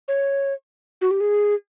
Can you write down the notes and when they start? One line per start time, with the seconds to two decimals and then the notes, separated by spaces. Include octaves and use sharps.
0.08 C#5
1.01 F#4
1.11 G4
1.21 G#4